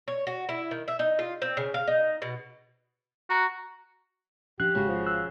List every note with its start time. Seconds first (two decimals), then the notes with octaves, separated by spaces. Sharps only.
0.08 C#5
0.27 F#4
0.49 E4
0.71 D#3
0.88 E5
0.99 D#4
1.19 F4
1.42 C4
1.57 C#3
1.74 F5
1.87 D#4
2.22 B2
3.30 F#4 A#5
4.60 F3 C#4 D4 G4 F5 F#6
4.75 G#1 C#3 G#3 C#4 F#4
4.88 F3
5.06 E6 F#6